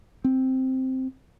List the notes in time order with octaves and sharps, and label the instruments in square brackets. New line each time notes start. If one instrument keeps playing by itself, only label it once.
[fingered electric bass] C4